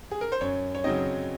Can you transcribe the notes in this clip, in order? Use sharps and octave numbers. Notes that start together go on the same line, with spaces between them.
G#4
A#4
C5
F#2 C#5
C#5
C#3 F#3 C4 D#4 D#5